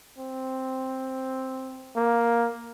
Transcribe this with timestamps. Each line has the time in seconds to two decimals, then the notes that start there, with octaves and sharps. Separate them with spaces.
0.18 C4
1.96 A#3